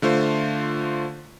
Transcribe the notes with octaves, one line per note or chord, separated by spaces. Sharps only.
D3 A3 F4 C5